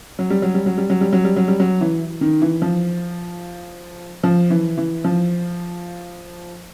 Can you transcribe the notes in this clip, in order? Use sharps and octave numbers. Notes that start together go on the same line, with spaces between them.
F#3
G3
F#3
G3
F#3
G3
F#3
G3
F#3
G3
F#3
G3
F#3
E3
D#3
E3
F3
F3
E3
E3
F3